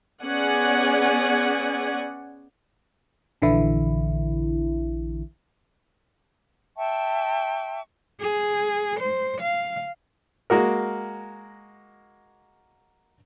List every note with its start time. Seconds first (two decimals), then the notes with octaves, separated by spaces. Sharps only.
0.25 B3 C#4 G#4 D5 F#5 G#5
3.42 A#1 D3 E3 E4
6.76 E5 G5 A5 C#6
8.21 G#4
9.00 C5
9.41 F5
10.50 G#3 A#3 F#4 A#4